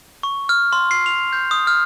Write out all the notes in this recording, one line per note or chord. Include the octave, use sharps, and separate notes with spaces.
C#6
F6
C6
C7
F7
G6
D#6
F6